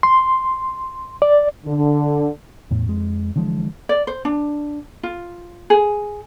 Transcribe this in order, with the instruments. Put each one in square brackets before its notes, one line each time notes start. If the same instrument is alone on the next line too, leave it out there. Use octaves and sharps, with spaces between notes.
[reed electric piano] C6
D5
[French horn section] D3
[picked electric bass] E2 A2
F2 G#3
D3 E3 F3 G#3
[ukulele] D5
C5
D4
F4
G#4